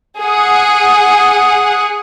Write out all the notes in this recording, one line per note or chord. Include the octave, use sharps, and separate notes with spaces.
G#4 F#5